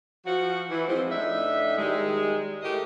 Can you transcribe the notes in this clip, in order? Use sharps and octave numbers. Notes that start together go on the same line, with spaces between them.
F3 F#4
E3
F3 G#3 C4
A2 D4 D#4 E5
D#3 G3 G#3
A2 A3 G4 A#4 D#5